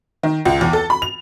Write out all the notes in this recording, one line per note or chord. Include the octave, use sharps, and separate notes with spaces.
D#3
C#2
E2
A4
B5
F7